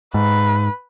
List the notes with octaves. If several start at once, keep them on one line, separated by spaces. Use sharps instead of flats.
G#2 B4